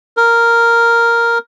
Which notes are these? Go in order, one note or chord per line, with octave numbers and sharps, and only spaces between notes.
A#4